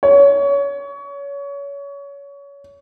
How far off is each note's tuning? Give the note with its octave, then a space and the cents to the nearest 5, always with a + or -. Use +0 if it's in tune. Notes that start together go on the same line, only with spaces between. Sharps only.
C#5 +25